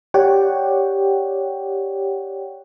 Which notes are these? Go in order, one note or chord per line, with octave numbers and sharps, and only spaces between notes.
G4 C#5 D5 F#5 G5